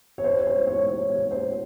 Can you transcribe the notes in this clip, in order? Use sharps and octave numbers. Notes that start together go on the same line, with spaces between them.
C#5
C5
C#5
C5
C#5
C#5
C#5
C5